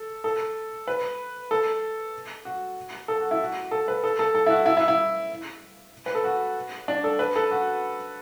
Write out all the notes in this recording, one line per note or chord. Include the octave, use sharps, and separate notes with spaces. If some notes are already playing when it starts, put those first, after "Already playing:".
Already playing: A4
A4
B4
A4
F#4
A4
F#4
E4
F#4
A4
B4
A4
A4
A4
E4
F#4
E4
E4
E4
B4
A4
F#4
D4
A4
B4
A4
F#4